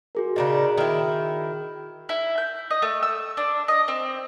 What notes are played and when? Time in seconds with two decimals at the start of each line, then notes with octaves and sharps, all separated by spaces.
0.15 F#4 G#4 A#4
0.36 C#3 D4 D#4
0.78 D#3 E4
2.09 E4
2.38 G6
2.70 D#5
2.82 A3
3.03 E6
3.37 D4
3.68 D#5
3.88 C4